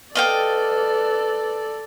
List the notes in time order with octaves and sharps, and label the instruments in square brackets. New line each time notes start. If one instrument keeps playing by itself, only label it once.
[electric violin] A4 D5 [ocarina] B4 [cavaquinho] D#5 F5 G5